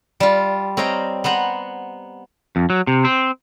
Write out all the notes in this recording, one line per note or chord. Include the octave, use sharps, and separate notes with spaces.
G3 F4
C4 C#5 D#5 F5 G5 A#5
B3 C5 F#5 A#5
F2
F#3
C3
C4